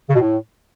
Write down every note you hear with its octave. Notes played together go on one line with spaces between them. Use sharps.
C#3
B2
A2